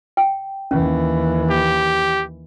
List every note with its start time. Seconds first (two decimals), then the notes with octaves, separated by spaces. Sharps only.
0.17 G5
0.71 D#2 E3 C#4
1.50 G4